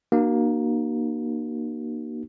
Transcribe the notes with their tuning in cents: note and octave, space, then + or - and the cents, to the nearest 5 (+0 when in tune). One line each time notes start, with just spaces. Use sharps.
A#3 +20 D#4 -40 F#4 +30